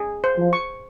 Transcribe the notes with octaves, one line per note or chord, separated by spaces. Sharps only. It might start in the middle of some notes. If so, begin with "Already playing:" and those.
Already playing: G#4
C5
F3
C#6